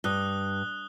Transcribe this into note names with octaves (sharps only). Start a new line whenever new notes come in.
G2 D#6 F#6 G7